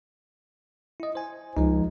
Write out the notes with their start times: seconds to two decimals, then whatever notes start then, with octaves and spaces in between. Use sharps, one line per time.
1.00 E4 D#5
1.15 C5 G#5
1.57 C#2 F3 G#3 D#4